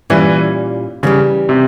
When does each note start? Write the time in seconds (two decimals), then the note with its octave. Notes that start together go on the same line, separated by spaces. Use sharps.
0.10 A#2 E3 G3 C#4 E4
1.03 C#3 E3 G3 C#4 G4
1.49 C3